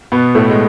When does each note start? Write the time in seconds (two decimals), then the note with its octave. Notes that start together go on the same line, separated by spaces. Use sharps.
0.12 B2 B3
0.35 A2 A3
0.50 G#3